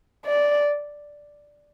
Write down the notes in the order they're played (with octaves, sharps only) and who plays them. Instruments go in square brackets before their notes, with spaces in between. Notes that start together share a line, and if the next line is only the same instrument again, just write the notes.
[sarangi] D5